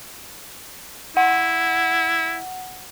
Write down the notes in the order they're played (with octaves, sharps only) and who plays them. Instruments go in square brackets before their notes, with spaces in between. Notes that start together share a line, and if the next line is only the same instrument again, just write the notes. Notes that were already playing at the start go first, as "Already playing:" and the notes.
[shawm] E4 [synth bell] F#5